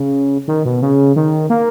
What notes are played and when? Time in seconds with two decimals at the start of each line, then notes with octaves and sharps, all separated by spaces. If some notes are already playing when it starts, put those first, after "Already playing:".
Already playing: C#3
0.48 D#3
0.65 B2
0.82 C#3
1.16 D#3
1.50 A#3